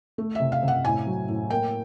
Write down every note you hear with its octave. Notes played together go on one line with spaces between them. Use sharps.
A3
C3 E5
F5
C3
F#5
A2 G#5
F#3
A2
A#3 G5